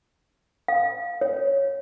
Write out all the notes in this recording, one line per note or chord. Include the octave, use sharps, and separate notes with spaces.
F5
C#5